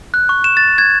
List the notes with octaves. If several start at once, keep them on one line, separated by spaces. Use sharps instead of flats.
F#6
C#6
E7
A6
G#6